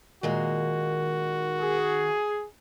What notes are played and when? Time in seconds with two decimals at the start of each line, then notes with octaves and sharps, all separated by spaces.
0.23 A#2 D#3 G#3 A#3 F#4
1.61 G#4